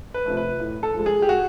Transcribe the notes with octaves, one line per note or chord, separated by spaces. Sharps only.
B4
C3 F3 A3
B4
A2
A4
F3 G#3
G#4
G4
F#4